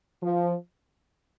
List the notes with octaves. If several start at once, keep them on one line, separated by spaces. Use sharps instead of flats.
F3